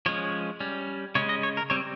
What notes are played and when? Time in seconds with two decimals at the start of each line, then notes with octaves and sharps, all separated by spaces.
0.06 F3 G#3 C#4 C#5
0.60 G3 C#4
1.15 C#3 G#3 C#4 C#5
1.29 D#5
1.43 C#5
1.57 A#4
1.70 G3 C4 C#5